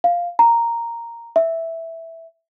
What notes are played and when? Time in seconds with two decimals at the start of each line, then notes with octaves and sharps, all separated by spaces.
0.04 F5
0.39 A#5
1.36 E5